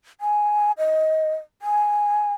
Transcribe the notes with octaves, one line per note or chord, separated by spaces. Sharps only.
G#5
D#5
G#5